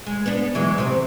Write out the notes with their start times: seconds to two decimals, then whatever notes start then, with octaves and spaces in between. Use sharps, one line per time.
0.06 G#3
0.26 B3 D4
0.55 E3 F#3 G#3
0.78 C3 C4